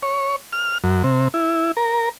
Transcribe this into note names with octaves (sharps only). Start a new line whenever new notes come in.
C#5
F6
F#2
C3
E4
A#4